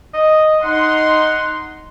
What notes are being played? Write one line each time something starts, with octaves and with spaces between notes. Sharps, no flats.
D#5
D#4 F#5 C6